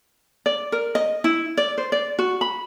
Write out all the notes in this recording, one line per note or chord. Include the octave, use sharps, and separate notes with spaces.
D5
A#4
D#5
E4
D5
C5
D5
F#4
B5